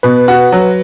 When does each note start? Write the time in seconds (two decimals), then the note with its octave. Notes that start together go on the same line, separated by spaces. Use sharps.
0.03 B2 B4
0.28 F#4
0.52 F#3